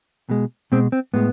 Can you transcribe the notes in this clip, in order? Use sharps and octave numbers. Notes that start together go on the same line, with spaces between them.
B2 G#3
B2 G#3 C4
C4
A2 G#3 B3